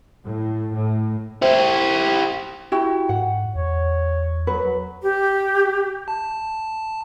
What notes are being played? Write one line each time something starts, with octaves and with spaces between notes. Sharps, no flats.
A2
A2
E4 G4 C5
E4 F#4 G4
G#2 F#5
E2 C#5
F#3 F#4 B4
G4
A5